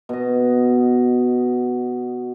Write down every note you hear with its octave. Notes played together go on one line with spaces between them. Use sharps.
B2 D#5